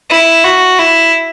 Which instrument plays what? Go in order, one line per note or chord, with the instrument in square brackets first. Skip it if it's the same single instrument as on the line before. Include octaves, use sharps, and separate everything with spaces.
[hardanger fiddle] E4
F#4
E4